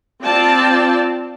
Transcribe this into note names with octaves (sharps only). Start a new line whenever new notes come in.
C4 F4 D5 A5